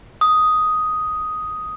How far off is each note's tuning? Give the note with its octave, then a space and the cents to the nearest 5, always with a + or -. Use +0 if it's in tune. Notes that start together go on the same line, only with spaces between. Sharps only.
D#6 +5